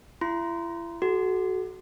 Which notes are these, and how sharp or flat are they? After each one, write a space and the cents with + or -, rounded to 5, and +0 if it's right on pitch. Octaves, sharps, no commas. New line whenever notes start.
E4 +40 C6 -25
F#4 +10 A4 -45